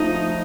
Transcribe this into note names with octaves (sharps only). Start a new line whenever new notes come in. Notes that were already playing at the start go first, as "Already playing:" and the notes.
Already playing: F3 A3 D#4